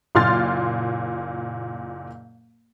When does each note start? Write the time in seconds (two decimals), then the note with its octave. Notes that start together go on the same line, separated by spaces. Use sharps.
0.15 F#1 A#2 C6 F6 A6